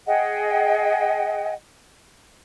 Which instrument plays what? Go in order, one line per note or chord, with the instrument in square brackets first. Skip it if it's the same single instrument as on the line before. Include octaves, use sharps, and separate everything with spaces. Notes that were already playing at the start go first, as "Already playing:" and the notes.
[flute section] G#4 D#5 F#5 G5